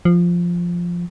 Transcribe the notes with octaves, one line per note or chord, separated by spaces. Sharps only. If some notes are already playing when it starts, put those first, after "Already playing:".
F3